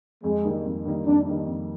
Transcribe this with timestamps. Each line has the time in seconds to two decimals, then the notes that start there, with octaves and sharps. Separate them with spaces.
0.24 F2 G#3
0.44 D#3 G3 A#3 D#4
0.65 F2
0.85 D#3 G3 A#3 D#4
1.07 F2 D4
1.27 D#3 G3 A#3 D#4
1.47 F2